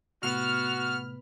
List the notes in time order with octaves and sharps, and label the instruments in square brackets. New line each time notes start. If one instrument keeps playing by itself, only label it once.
[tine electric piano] A2 C3 A3 [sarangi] B3 [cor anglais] F#4 [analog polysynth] F6